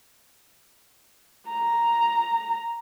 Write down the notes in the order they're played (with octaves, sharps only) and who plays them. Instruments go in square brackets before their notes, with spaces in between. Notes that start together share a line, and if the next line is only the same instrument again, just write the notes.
[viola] A#5